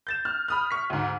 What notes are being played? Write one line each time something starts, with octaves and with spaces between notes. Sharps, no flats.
G6 A6 E7
F6
B5 D#6 F6
C#6 B6
D2 G#2